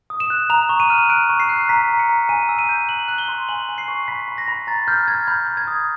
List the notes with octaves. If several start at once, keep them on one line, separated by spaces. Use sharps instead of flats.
D#6
E7
F#6
A#5 F7
C#6
D#7
F6
D#7
F#6 D7
C#6
C7
F#6
A#5 B6
A#5
C#7
A#5
G#5 D#7
E6
D#7
G6
F#6 F#7
F#6
G7
C6
G#5 F#7
G#5
C7
C#6
B5 B6
B5
A#6
B5
A#5 A6
F6 G6
F6 G#6
B5 G6
G6
G#6
D#6